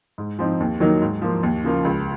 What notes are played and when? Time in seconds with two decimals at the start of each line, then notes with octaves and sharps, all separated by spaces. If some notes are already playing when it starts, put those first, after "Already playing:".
0.18 G#2
0.39 F3 C4 D#4
0.60 D#2
0.80 D#3 F#3 A#3 D#4
1.01 G#2
1.22 F3 A#3
1.43 D#2
1.64 C#3 F3 A#3 F4
1.85 C#2